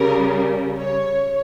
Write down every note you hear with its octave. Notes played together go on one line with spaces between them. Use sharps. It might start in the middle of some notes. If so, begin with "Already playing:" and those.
Already playing: C#3 G3 A#4
C#5